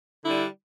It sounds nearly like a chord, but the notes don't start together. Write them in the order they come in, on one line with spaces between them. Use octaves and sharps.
D3 E4 G3 D4